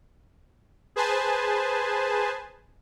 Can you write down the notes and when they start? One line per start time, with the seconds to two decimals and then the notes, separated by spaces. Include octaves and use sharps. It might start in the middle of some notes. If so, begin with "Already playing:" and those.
0.96 G#4 B4 C5 G#5 A5